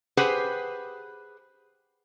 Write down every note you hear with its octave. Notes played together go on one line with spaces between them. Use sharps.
G4 G#4 B4 C5 F#5